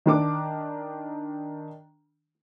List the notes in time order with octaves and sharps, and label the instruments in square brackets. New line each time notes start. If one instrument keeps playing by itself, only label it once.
[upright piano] D#3 D4 D6